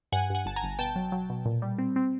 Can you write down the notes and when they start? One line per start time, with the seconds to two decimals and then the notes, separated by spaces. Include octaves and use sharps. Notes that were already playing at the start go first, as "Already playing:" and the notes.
0.12 G2 F#5 G#5
0.30 G2 F#5 G#5
0.45 G1 A5
0.56 G#5 A#5
0.63 G1
0.79 B2 G5 A5
0.96 F#3
1.12 F#3
1.30 B2
1.46 A#2
1.62 G3
1.78 C4
1.96 C4